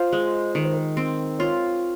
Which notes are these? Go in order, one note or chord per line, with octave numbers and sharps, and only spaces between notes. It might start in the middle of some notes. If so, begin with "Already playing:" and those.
Already playing: F4 C5
G#3
D#3 A#4
C5
A#4
C4
F4 C#5